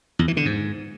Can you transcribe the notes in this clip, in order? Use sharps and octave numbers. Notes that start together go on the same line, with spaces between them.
E2
E3
D3
G#2